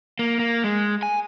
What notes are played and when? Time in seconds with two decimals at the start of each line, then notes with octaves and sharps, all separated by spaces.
0.19 A#3
0.39 A#3
0.64 G#3
1.03 G#5